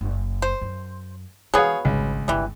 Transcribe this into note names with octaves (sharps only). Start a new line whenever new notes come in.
F#1
C5
F#2
E3 F#3 B3 G#4 C#5 F5
G#1 C#2 G3
G1 D#3 E3 G3